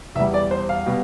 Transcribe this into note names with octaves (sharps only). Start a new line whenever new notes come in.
E2 B2 G3 E5
D5
C5
F5
B2 G3